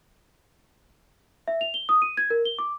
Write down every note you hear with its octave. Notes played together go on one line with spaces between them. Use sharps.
E5
F7
G7
D#6
D#7
G#6
A#4
G7
D6